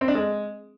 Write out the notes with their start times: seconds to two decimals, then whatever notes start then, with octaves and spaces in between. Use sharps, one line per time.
0.01 C4
0.08 D4
0.15 G#3